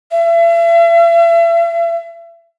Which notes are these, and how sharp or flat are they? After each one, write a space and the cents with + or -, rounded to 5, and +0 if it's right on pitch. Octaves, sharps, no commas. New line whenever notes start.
E5 +40